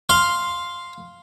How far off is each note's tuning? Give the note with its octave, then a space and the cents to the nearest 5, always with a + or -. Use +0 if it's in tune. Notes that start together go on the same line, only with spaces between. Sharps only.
F5 +0 C6 +0